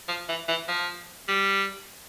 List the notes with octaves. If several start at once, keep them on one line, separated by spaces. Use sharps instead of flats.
F3
E3
E3
F3
G3